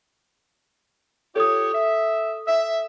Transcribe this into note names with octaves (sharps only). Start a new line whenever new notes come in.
F4 G4 A4 C#5 D#6
E5
E5